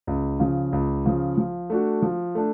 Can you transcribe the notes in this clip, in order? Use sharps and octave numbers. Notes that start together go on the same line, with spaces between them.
C#2
C#3 F3
C#2
C#3 F3
F3
A3 D4 F#4
F3
A3 D4